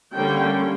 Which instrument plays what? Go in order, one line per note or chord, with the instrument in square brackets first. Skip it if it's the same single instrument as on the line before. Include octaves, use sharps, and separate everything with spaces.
[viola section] D3 G3 A#3 C#4 G5